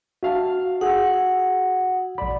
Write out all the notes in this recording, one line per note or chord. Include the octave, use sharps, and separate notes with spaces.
F#4 E5 F5 A5
G#4 F#5 E6
A#1 D5 B5